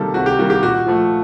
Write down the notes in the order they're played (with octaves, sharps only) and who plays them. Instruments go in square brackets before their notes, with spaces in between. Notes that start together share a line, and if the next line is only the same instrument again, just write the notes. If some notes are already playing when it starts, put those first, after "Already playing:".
Already playing: [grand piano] C3 D#3 G3 A#3 A4
C3 F#4
G4
D#3 G3 A#3 F#4
G4
A#2 F#4
F3 A3